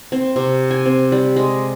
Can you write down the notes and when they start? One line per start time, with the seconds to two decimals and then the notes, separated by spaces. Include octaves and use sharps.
0.12 C4
0.36 C3
0.71 G#5
0.86 C4
1.12 G3
1.36 G#3